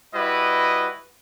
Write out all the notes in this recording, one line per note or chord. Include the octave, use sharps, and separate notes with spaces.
G3 E4 F#4 B4 D#5